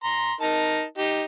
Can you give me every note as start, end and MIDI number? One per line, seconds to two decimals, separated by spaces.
0.04 0.33 82
0.04 0.33 84
0.41 0.83 63
0.41 0.83 70
0.41 0.83 81
0.98 1.24 63
0.98 1.24 67